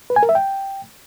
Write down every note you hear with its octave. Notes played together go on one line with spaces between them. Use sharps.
B4
G#5
A#4
E5
G5